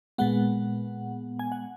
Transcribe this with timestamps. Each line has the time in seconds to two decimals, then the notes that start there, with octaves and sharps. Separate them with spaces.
0.18 A#2 G#3 B3 F#5
1.39 G#5
1.52 F#5